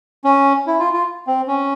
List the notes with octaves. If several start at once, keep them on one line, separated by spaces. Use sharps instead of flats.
C#4
E4
F4
F4
C4
C#4